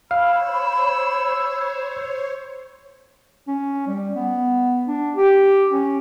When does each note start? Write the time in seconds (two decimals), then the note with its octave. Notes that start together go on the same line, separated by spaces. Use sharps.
0.11 C5 C#5 F5 B5 E6
3.47 C#4
3.87 G3
4.15 B3
4.88 D4
5.16 G4
5.72 C#4